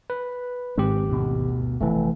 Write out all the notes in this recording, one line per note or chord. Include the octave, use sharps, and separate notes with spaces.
B4
G#1 G#3 C4 G4
D2 G2 B2
F1 E3 A3